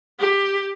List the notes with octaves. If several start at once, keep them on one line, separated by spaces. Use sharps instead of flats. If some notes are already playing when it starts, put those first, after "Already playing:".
G4